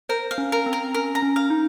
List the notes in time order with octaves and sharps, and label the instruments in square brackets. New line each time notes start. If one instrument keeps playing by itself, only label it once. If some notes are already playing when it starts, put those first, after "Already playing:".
[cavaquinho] A#4 [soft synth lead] C5
[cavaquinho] F5
[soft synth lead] C#4
[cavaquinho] A#4
[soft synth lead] C4
[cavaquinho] A#4
[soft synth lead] C#4 [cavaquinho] A#4
[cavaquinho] A#5
[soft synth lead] C#4
[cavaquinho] F5
[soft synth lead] D#4